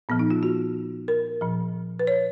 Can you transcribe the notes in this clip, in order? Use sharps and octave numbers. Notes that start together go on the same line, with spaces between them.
A#2 F3 B3
D#4
F4
F#4
A#4
A#2 F3
B4
C#5